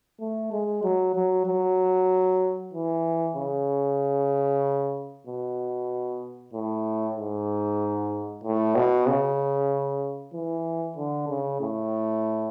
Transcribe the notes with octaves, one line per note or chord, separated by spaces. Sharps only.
A3
G#3
F#3
F#3
F#3
E3
C#3
B2
A2
G#2
A2
B2
C#3
E3
D3
C#3
A2